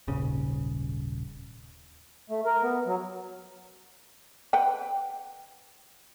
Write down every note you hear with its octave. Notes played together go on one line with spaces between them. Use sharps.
D#1 G#1 C#3
A3
A#4
B3
F#3
B4 F#5 G5